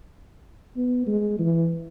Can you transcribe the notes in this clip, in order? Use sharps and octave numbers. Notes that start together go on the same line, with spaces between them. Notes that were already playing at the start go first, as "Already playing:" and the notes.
B3
G#3
E3